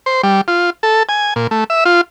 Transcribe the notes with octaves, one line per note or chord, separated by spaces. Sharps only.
C5
G3
F4
A4
G#5
A#2
A3
E5
F4